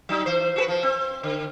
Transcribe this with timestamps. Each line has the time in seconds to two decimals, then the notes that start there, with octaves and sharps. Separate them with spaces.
0.09 F#3 D#4
0.26 E3 C5
0.56 F#4 G#4 B4
0.68 F3
0.83 C4
1.23 D3